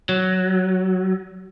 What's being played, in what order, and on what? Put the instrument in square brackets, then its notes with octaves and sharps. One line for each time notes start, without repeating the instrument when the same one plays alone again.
[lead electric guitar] F#3